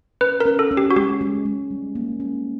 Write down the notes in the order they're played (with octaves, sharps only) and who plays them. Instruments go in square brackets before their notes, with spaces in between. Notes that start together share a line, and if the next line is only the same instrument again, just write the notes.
[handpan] C#4 [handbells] B4
[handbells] A#4
[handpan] C#4
[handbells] A4
[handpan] C#4
[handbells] G4
F#4
[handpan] G#3 [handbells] G4
[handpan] G#3
G#3
G3
A#3
C#4